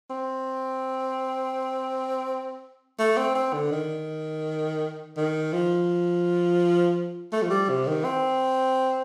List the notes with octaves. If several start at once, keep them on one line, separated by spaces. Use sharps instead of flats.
C4
A3
C4
C4
D3
D#3
D#3
F3
A3
F3
G3
C3
D#3
C4